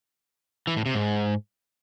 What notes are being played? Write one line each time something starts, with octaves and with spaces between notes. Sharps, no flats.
E3
A2
C3
G#2